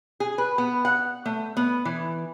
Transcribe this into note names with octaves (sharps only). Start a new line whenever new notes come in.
G#4
B4
B3
F#5
A3
B3
E3